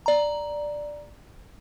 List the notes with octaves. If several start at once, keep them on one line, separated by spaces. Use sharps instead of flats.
D5 A#5